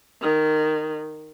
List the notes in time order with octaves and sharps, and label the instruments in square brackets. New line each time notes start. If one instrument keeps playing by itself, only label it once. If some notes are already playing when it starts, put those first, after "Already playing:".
[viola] D#3